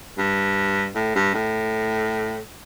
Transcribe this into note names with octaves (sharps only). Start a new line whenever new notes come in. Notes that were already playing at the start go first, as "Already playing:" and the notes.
G2
A2
G2
A2